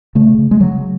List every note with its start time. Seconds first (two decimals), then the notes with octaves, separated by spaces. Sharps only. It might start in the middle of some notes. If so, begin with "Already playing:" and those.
0.15 C#3 A3
0.38 C#3
0.51 G#3
0.61 C#3 F#3